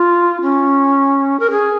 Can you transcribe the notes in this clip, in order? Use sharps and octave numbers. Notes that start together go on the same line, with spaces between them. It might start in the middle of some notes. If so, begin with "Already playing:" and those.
Already playing: F4
C#4
A#4
G#4